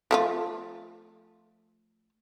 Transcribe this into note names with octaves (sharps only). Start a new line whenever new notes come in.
F3 A3 F4